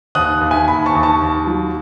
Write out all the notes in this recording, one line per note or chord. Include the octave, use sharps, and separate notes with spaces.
D#2 D#6 F#6
D#2
E5 G#5
D#2 G#5 B5
A5 C#6
D#2
A5 C#6
D#2
F#3